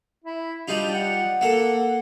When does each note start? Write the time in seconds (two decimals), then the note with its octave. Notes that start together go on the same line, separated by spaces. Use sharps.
0.24 E4
0.68 G3 D4 D#4 F4
0.94 F#5
1.41 A#3 A4 F#5